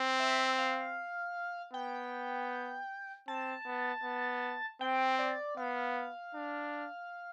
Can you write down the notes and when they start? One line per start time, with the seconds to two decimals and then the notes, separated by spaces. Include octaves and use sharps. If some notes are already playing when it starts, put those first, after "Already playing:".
Already playing: C4
0.20 E5
0.58 F5
1.74 B3 G5
3.28 C4 A5
3.66 B3
4.04 B3
4.81 C4 G5
5.19 D5
5.57 B3 F5
6.35 D4